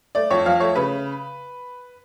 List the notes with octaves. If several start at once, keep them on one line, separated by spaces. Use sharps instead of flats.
A3 D5
F2 C#5
F3 F5
A3 C#5
C#3 B4